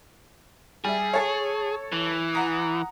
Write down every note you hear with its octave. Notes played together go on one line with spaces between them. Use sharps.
G3 G#4 E5
A4 C#5
E3
F#5 A#5 D#6